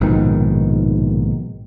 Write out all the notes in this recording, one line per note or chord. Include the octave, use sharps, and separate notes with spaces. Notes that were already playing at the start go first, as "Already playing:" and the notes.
A#1 G#2 B2 D#3